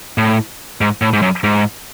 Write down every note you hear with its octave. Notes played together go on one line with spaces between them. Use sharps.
A2
G#2
A2
G#2
F#2
G#2